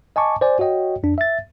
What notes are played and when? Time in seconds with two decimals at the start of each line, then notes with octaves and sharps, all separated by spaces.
0.16 D#5 G#5 A5 C#6 D6
0.41 C5 D5 G#5
0.59 F#4 C#5 D#5 G5
1.03 F2 D4
1.18 E5 A6